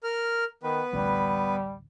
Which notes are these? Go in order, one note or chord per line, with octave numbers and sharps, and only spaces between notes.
A#4 F6
D#3 B3 B4
A1 D2 G3